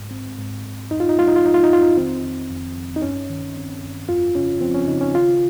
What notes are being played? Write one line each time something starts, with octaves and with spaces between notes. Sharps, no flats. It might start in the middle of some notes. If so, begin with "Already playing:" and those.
Already playing: G#2
C4
G#2
G#2
F2 D#4
F4
D#4
G#3 F4
D#4
F4
F3 D#4
F4
D#4
F2 F4
D#4
D#3 C4
F2
F2
F2
D#4
G2 C#4
D#3
C4
G2
F2 F4
C#3 C#4
F3 C4
C#4
C#3 D#4
C#4
D#3 F4